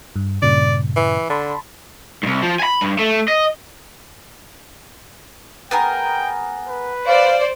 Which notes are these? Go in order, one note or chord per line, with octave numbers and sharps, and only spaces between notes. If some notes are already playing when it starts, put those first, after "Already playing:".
G2
G2 A#2 C#3 D5
E3
D3 A5 B5 C6
C2 G2
F3
G#5 B5
G2
A3
D#5
B3 G#4 A#4 G5
B4
C5 D5 F5